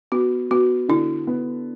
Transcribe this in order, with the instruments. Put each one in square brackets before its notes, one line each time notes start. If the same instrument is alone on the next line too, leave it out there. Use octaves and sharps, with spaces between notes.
[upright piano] B3 [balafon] F#4
[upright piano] B3 [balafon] F#4
[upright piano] D3 [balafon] E4
[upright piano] B3